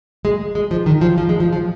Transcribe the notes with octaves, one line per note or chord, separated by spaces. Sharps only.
G#3
G#3
F3
D#3
F3
F3
G#3
F3
F3